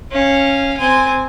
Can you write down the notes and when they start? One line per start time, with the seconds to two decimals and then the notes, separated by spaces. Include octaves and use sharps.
0.12 C#4 F5
0.77 C4 G#5